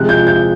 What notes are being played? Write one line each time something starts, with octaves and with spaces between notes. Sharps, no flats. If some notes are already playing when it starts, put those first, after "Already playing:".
Already playing: C3 F3 G#3 F#6
G6
G6